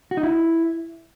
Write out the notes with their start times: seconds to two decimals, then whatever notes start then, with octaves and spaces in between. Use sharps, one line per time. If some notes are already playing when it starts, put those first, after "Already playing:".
0.11 F#4
0.17 D#4
0.23 E4